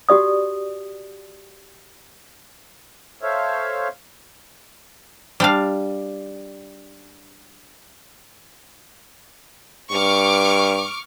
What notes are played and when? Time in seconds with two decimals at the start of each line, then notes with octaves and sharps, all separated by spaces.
0.09 F#4 G4 D5 D#6
3.22 A4 C5 C#5 E5 F5
5.40 G3 D4 F5
9.92 G2 C#6 D6 F6